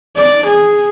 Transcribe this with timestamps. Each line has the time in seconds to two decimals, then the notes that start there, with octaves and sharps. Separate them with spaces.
0.16 D5
0.46 G#4